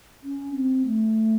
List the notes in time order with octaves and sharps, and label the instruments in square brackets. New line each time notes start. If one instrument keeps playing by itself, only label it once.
[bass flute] C#4
C4
A3